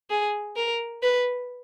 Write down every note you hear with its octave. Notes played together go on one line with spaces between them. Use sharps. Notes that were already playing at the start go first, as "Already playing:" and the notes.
G#4
A#4
B4